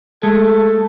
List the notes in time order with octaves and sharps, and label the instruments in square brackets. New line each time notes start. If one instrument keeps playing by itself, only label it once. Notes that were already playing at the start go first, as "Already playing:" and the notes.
[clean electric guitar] G#3 A3 [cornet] A4